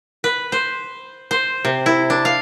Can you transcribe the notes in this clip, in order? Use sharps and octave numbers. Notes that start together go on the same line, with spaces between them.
B4
C5
C5
C3
E4
D4
F5